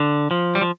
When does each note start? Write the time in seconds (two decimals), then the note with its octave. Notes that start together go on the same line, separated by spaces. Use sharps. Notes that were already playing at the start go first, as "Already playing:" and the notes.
Already playing: D3
0.31 F3
0.55 G3
0.61 F3